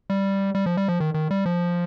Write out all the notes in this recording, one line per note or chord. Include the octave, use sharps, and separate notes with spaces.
G3
G3
F3
G3
F3
D#3
D#3
G3
F3